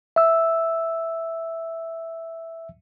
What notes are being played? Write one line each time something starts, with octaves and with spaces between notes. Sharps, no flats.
E5 E6